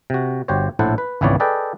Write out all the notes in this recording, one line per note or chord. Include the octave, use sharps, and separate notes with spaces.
C3 F#4
G1 F#4 G4 C5 C#5
A#1 A2 E4 A4 C5 F#5
B4
G#1 C#2 E3 B3 C#5 D5
G#4 A4 B4 D5 D#5 G5